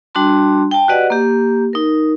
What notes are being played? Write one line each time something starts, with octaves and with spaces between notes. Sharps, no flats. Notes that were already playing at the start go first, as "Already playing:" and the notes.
G3 D4 F#4 A5 C6
G5 A5
F#4 G4 B4 D5 D#5 F#5
A#3 G4
D#4 A#4